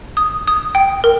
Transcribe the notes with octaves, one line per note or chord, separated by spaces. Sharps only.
D#6
D#6
G5
A#4